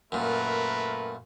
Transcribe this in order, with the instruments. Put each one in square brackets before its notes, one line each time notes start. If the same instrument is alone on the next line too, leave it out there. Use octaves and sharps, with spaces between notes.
[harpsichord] F#2 A#2 [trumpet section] A3 A#4 B4